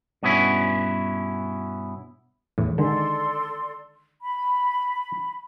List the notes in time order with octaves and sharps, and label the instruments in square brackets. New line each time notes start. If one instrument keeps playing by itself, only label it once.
[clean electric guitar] G2 B2 B3 C#4 E4
[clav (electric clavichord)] E2 A2
[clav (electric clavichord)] D3 D#3 G#3 [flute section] A4 D5 C6
[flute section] B5